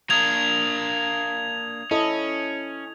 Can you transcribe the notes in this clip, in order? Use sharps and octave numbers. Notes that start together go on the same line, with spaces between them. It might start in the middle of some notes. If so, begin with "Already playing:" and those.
A#3 D4 D#6 G#6 F7
C#4 E4 A4 D#5